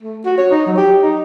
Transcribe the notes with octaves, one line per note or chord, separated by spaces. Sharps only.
A3
F#4
C#5
D#4
F#3
G4
D#4